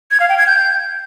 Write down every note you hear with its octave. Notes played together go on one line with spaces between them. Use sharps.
G#6
F5
G5
G#6
G6